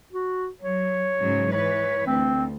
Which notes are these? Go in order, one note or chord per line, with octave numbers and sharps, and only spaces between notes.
F#4
F#3 C#5
G#2 C#3 F#3
E3 B4 C#5
D2 C4